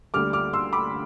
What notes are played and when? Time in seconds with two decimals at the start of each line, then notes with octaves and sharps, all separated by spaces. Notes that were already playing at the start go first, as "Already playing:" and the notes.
0.14 D2 D3 G3 D6 F6
0.33 D6 F6
0.53 C6 E6
0.73 B5 D6